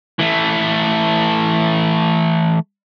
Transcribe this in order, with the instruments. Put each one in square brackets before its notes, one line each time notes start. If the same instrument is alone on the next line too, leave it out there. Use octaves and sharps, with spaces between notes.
[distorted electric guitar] E3 A3